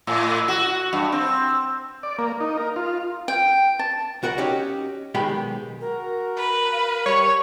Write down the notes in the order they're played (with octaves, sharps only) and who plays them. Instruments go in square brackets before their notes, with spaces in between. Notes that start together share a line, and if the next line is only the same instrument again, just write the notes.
[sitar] A2
F#4
G2
C4
[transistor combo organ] D5
A#3
D#4
A#4
F4
[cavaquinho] G5
A5
[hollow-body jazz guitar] C#2 F#4 A#4 F#5
C#4 D#4 G4 C#5
B1 D#3 G#3 G4 G5 B5
[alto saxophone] F#4 [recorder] A#4
[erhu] B4
[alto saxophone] F5
[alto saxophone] G3 [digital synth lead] C#5